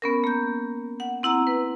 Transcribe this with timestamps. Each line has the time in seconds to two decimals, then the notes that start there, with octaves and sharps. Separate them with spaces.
0.02 B3 C#4 A#4
0.24 A#3 G6
1.00 F#5
1.23 C4 E4 F#5 A#5
1.47 B4